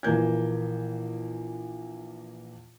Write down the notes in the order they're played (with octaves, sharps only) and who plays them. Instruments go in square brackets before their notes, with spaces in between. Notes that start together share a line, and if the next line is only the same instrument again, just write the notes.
[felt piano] A#1 E3 A#3 G6 G#6